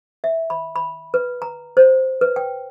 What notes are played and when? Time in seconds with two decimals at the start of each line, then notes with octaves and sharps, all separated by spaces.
0.24 E5
0.50 B5
0.76 B5
1.14 B4
1.42 A#5
1.77 C5
2.21 B4
2.36 G5